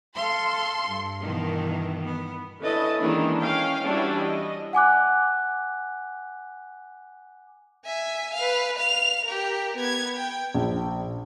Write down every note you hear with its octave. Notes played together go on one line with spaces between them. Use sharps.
A4 F5 C6
G2
B2 D#3 E3
B3
D3 C#4 E4 B4 D#5 A5
D#3 E3 G#3 A#3 C#4 D4
C#4 F5 G5
E3 G3 C#4 D4 E4 F#4
D#5
F#5 G#5 D6 F#6
E5 G#5
B4 F5
F5 F7
G4 A#4
B3 G#6
G5
A#1